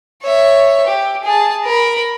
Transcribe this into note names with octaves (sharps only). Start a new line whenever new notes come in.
C#5 E5
G4
G#4 A5
A#4 B5